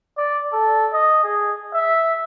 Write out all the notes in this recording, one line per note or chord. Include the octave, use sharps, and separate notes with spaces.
D5
A4
D#5
G#4
E5